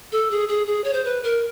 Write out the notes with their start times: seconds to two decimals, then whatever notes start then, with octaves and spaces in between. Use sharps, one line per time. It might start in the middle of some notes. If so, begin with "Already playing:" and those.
0.12 A4
0.31 G#4
0.48 G#4
0.67 G#4
0.84 C#5
0.93 C5
1.05 B4
1.23 A#4